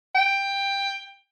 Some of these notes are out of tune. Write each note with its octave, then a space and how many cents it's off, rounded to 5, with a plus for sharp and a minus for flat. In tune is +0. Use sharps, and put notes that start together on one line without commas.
G5 +10